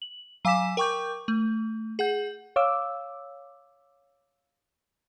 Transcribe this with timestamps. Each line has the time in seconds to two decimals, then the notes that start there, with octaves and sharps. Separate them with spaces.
0.02 F#7
0.45 F#3 F5 G#5 D6 B6 E7
0.77 A#4 G5 C#6 D6 G6
1.28 A3
1.99 G#4 F#5 G6
2.56 C#5 F5 D6 E6